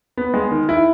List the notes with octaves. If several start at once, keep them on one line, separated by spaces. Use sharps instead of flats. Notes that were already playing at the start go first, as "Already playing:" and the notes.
B3
G#3
D#3
E4